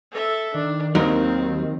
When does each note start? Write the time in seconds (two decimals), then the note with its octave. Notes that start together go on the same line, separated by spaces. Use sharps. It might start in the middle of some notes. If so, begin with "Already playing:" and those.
0.11 A4 E5
0.54 D#3 D4
0.95 D#2 F#3 C4 D#4 A#4